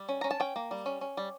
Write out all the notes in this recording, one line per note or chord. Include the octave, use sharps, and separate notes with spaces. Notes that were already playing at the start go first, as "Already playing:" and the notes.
Already playing: G3
C#4
C#4 A#5
A5
C#4 G5
A#3
G3
C#4
C#4
G3